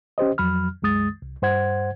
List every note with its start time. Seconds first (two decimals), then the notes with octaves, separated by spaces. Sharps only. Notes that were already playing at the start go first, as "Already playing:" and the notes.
0.18 C#4 G4 C5 D#5
0.38 F2 F#3 B5 F6
0.82 C2 F#2 G#3 D#6 A6
1.22 C2
1.42 G2 C5 F#5 G#6